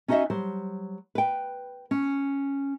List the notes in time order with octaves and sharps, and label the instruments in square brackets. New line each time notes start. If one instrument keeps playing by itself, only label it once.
[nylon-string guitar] C#4 D#4 F#4 C#5 D#5 E5
F#3 G3 C5
B4 G5
C#4